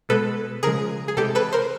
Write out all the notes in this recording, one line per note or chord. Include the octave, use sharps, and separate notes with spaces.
B2 G#3 A4 B4
C#3 F3 G#3 G#4 A#4
G#4
C3 E3 G#3 G4 A4
A4 B4
A#4 C5